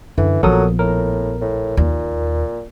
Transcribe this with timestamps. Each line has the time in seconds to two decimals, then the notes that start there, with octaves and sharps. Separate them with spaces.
0.18 F#2 D3 E3
0.43 A#1 F3 F#3 B3 A4 A#4 D#6
0.79 A2 A#4
1.41 A2
1.77 D#2 A#2